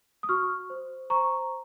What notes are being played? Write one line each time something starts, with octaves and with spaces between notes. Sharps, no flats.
D#6
F#4 C#6 F6
C5
C5 A#5 C#6